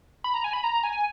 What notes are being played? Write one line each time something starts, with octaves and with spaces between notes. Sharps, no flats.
B5
A#5
G#5
B5
A#5
G#5